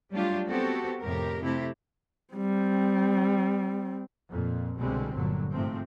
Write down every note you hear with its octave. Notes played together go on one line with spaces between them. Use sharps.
F#3 G3 A3 D4 F4 G4
B3 C4 F#4 G4 A4
F2 A2 C3 G4 A#4
C3 A3 C4 E4 G4
G3 C4
F2 A#2
C2 B2 D3 G3 G#3 C4
G1 G2 A#2 D3 F#3
G#2 C3 F3 A3 C4